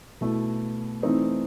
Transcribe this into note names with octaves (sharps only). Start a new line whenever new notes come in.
B2 A3 E4
E3 A3 C4 D#4